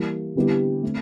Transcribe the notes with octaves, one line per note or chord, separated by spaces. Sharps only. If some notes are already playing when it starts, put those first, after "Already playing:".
Already playing: E3 G3 A#3
D3 G3 B3 E4 G4
A3 C4